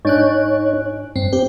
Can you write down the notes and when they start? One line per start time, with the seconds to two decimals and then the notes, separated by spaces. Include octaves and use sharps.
0.05 G#2 D4 D#4 C#5 F#6
1.16 G2 C4
1.33 C4 G4